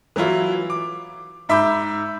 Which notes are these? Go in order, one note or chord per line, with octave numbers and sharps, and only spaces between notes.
E3 F#3 E4 F4
D6
G#2 E5 B5 D6 E6 G6